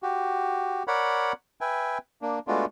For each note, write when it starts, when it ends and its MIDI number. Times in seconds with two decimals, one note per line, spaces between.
0.03 0.83 66
0.03 0.83 67
0.87 1.33 70
0.87 1.33 73
0.87 1.33 74
0.87 1.33 78
0.87 1.33 83
1.61 1.98 71
1.61 1.98 76
1.61 1.98 79
1.61 1.98 80
2.22 2.39 58
2.22 2.39 62
2.47 2.65 56
2.47 2.65 57
2.47 2.65 59
2.47 2.65 62
2.47 2.65 65
2.47 2.65 66